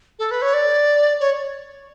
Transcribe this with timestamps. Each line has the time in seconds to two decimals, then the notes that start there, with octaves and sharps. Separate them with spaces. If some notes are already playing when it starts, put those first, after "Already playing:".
0.19 A4
0.31 B4
0.42 C#5
0.54 D5
1.20 C#5